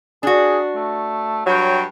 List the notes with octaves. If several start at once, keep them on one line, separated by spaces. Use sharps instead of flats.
D4 F#4 G#4
A3
G2 F#3 C#5 G5